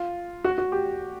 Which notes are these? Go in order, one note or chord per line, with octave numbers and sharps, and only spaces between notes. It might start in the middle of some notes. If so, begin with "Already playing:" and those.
Already playing: F4
F#4
F#4
G4